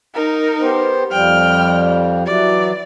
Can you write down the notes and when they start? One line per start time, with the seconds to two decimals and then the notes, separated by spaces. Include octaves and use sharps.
0.14 D#4 A#4
0.61 B3 G4 C5
1.11 F2 F3 G3 G5 F6
2.26 E3 F#3 D5